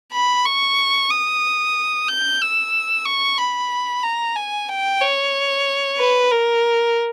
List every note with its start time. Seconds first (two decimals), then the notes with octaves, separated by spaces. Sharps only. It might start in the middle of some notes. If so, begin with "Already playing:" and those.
0.13 B5
0.46 C#6
1.10 D#6
2.08 G6
2.41 E6
3.05 C#6
3.38 B5
4.03 A#5
4.36 G#5
4.69 G5
5.01 C#5
5.98 B4
6.31 A#4